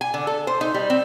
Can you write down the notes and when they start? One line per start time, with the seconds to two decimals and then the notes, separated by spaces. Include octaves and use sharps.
0.01 G#5
0.14 D3
0.27 A4
0.47 C5
0.61 D#4
0.74 G3
0.90 C4